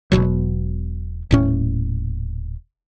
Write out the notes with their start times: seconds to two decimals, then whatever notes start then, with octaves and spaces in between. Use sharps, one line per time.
0.12 E1 B1 B2 F#3
1.31 D#1 A2 C#4